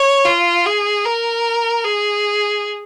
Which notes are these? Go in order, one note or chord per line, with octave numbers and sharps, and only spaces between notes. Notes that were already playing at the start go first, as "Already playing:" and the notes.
Already playing: C#5
F4
G#4
A#4
G#4